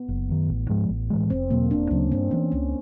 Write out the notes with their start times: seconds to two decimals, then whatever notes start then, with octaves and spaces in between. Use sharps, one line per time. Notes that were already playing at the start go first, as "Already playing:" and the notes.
Already playing: B3
0.08 F#1
0.29 F#2 D#3
0.49 A1
0.69 G#2 F3 G#3
0.89 A1
1.10 A2 E3 G#3
1.30 F1 C4
1.50 E2 B2 F#3 A#3
1.70 E1 D4
1.90 D2 C#3 F#3 C#4
2.11 G2 C4
2.31 E3 G#3 C#4
2.36 B3
2.52 C#2 C#4